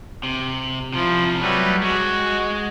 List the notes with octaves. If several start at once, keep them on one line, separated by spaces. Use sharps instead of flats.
C3
C3 F3 E4
F#3 G3 A3 B4
G#3 F#4